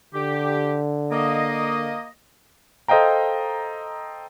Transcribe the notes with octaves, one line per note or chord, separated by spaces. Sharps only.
D3 G4
A#3 D#5
A4 C5 D#5 F5 G5 A#5